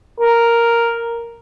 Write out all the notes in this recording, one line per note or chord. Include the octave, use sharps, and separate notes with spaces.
A#4